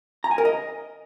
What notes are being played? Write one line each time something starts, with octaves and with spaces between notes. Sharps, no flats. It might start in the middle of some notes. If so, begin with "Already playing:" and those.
A#5
G#5
A#4
D#5